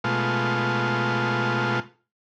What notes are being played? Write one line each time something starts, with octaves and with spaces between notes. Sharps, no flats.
B2 G#3 A3 F4